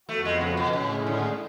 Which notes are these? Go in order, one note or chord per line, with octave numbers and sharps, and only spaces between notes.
F2 F3 A3 B3 F#4
G#3
C#3
B2
A2 C#3 G#3 C#4
D3